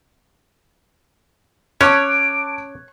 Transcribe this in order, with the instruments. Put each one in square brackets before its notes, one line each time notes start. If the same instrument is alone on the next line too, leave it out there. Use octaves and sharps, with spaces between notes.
[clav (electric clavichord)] C#4 [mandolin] C#5 [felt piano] A5 D6 F#6 [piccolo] D7